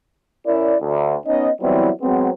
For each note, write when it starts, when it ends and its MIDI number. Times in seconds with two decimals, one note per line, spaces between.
0.46 0.75 61
0.46 0.75 64
0.46 0.75 70
0.46 0.75 74
0.81 1.15 38
1.27 1.49 59
1.27 1.49 61
1.27 1.49 63
1.27 1.49 75
1.61 1.90 52
1.61 1.90 54
1.61 1.90 55
1.61 1.90 59
1.61 1.90 60
1.61 1.90 64
2.02 2.30 54
2.02 2.30 56
2.02 2.30 59
2.02 2.30 60